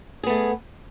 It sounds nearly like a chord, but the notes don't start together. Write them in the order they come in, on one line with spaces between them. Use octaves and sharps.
G#4 B3 A3